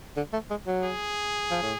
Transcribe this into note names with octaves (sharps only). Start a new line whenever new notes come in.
D3
A3
G#3
F#3
G#4
F3
A2